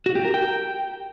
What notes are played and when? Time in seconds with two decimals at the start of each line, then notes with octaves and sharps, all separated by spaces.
0.06 F#4
0.15 G4
0.25 A#4
0.34 G5